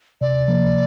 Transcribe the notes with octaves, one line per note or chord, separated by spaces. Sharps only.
C3 D5
F3 A#3